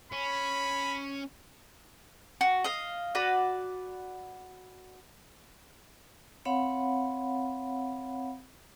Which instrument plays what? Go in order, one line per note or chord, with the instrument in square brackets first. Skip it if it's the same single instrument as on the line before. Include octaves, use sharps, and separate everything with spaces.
[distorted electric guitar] C#4 [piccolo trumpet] B5
[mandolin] F#4
D#5 F5
F#4 B4 D5
[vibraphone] C4 C#5 F5 F#5 B5